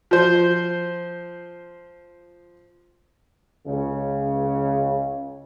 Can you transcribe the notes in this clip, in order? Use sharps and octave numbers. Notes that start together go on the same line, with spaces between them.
F3 C5
C#2 C#3